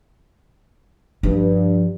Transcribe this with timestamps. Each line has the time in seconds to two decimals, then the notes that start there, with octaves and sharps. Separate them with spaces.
1.23 G2 F3